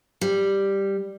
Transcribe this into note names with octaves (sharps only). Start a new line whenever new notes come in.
G3